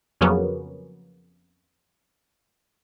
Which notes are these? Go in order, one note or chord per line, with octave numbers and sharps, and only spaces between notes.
F2 C#3 F#3 A#3 B3 C#4